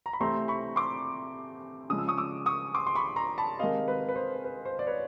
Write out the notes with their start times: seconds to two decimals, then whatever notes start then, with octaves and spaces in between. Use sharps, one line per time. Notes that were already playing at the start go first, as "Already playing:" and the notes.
0.06 A#5
0.13 B5
0.20 C3 E3 A3 C4 A#5 C6
0.48 B5 C#6
0.76 C6 D6
1.90 C#3 F3 G#3 D#6
1.98 E6
2.08 C#6 D#6
2.18 D6 E6
2.46 C#6 D#6
2.75 C6 D6
2.87 C6
2.95 B5 C#6
3.16 A#5 C6
3.38 A5 B5
3.59 C3 D#3 G#3 D#5 F5
3.88 B4
4.09 B4
4.16 C5
4.44 B4
4.65 C5
4.79 D5
4.87 B4 C#5